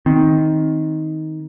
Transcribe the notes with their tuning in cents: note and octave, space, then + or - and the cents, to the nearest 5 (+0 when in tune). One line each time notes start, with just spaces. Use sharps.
D#3 +15 C4 +0